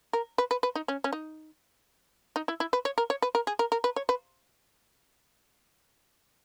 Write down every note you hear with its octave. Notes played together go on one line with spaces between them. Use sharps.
A#4
B4
B4
B4
D#4
C#4
C#4
D#4
D#4
E4
E4
B4
C#5
A#4
C#5
B4
A#4
G#4
A#4
A#4
B4
C#5
B4